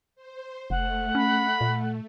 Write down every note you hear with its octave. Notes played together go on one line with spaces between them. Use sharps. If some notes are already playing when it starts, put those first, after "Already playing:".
C5
F1 A3 F#5
C#4 B5
A#2